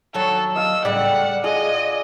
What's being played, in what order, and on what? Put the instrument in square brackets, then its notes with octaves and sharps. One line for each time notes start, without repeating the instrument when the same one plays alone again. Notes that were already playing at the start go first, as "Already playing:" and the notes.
[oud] D#2 F#3 C#5 [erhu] A4
[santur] D#5 F5 [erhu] E6
[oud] A2 C#3 G3 [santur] D5 [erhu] F#5
[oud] F4 [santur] G#4 [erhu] D#5